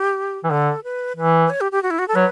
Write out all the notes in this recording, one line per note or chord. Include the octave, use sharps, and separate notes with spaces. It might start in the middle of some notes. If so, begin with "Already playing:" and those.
Already playing: G4
E3
D3 A4
B4
E3 B4
B4
C#5
G4
G4
F#4
E4
F#4
A4
F#3 B4